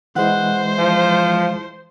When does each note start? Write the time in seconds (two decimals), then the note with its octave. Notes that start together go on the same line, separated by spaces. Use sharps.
0.16 E3 G#3 E4 C5 F#5
0.78 F3